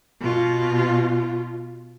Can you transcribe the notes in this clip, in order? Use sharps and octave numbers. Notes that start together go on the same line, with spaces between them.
B2 F4